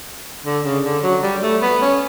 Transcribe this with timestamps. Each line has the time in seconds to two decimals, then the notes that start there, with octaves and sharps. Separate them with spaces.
0.45 D3
0.65 C#3
0.84 D3
1.04 F#3
1.23 G3
1.42 A3
1.62 B3
1.82 C#4